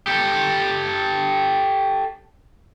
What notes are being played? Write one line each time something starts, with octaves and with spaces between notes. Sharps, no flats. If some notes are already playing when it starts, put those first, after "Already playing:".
G4 A4